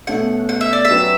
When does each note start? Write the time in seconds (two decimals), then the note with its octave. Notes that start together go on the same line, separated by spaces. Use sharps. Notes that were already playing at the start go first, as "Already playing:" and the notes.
0.07 B2 A3 C#4 F#5
0.49 F#5
0.61 E5
0.73 D5
0.85 E5
0.91 F#3 C#4 G4 B4